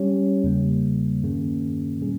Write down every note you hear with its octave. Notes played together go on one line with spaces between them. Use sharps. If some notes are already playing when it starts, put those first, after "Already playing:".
Already playing: G3 C#4 G4 C#5
E2 C#3 G3 A#3
G2 D#3 A#3 C#4 G#4
A#2 G3 C#4 G#4